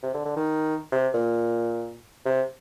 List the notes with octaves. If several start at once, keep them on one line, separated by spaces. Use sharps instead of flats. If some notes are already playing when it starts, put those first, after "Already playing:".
C3
D3
D3
D#3
C3
A#2
C3